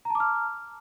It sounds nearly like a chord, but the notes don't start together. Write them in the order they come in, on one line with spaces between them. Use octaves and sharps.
A#5 A5 D6 F6